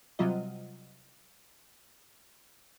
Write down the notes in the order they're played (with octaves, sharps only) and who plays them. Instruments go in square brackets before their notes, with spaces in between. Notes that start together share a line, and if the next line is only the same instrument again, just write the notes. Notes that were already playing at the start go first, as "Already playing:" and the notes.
[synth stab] C3 F#3 G3 F4 D#5